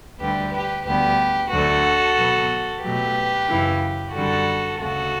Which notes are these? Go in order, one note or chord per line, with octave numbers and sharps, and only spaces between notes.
D2 D3 G3 G4 B4
G4 B4
D2 D3 G3 B3 G4 B4
D2 D3 F#3 A3 F#4 A4
B2 F#3 B3
B2 F#3 A3 G4 B4
F#2 C#3 E3
F#2 D3 G3 F#4 A4
D2 C#3 F#3 F#4 A4